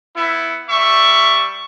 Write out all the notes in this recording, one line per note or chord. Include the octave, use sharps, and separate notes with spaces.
B3 E4
G3 E5 C#6